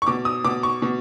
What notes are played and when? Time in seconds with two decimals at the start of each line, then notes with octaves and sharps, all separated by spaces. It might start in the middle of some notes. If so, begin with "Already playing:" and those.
0.02 C#6
0.07 B2 D6
0.25 D#6
0.45 B2 D6
0.63 C#6
0.82 B2